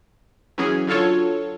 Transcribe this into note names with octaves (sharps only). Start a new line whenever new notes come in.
E3 F#3 C#4 G#4
D3 F#3 F4 A4 C#5